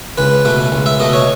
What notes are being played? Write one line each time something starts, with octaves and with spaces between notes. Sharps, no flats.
C#2 B4
B2 A3
C#2
E5
B2 A3 D#5
C#5